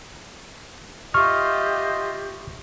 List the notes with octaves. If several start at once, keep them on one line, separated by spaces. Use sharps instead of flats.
F4 G4 D#5 E5 C#6 F6